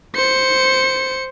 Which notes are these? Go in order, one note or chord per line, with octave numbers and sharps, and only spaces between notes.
C5 C#7